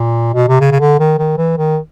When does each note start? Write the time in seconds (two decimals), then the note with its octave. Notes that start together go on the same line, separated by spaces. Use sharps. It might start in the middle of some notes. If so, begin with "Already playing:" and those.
Already playing: A#2
0.34 B2
0.49 C3
0.61 C#3
0.72 C#3
0.80 D3
1.00 D#3
1.19 D#3
1.37 E3
1.58 D#3